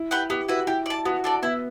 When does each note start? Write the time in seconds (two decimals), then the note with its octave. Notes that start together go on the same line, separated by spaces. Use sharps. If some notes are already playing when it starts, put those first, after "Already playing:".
Already playing: E4
0.11 G4 B4 F#5
0.30 B3 G4
0.48 E4 F#4 B4
0.67 E4 G4
0.86 D5 A5
1.05 B3 F#4
1.24 D4 A4 D5
1.42 B3 E4